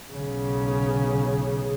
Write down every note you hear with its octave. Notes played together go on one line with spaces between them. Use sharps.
B1 C#3